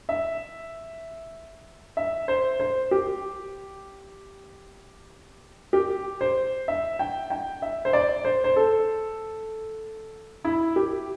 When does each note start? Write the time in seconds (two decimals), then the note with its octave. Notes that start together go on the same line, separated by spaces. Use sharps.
0.09 E5
1.97 E5
2.28 C5
2.60 C5
2.91 G4
5.73 G4
6.21 C5
6.68 E5
6.99 G5
7.30 G5
7.62 E5
7.85 C5
7.93 D5
8.25 C5
8.44 C5
8.56 A4
10.44 E4
10.76 G4